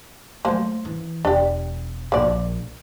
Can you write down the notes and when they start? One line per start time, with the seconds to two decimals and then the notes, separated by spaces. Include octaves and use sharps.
0.45 F#3 A3 A#3 C5
0.85 E3
1.25 E1 D4 G4
2.12 A#1 A#3 D5